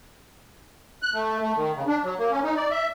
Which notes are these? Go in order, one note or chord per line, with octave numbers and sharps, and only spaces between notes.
F#6
A3
A3
D#3
C#3
D4
F#3
A#3
C#4
D#4
D5
E5